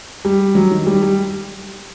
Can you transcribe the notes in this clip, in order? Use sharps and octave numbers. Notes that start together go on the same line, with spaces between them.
G3
F#3
D#3
G3
G3